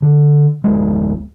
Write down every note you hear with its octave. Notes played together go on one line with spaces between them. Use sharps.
D3
D1 G#3